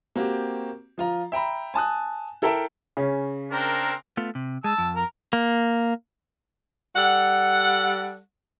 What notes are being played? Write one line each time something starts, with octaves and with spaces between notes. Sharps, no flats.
A#3 C4 F#4 G4
F3 F4 A#5
E5 G5 A#5 B5
G#5 A5 D#6 F#6
E4 A4 A#4 E5 G5 A5
C#3 C#4
C4 D4 A#4
A3 B3 F4
C3
G#3 A5 E6
F2
A#4
A#3
G3 A4 F#5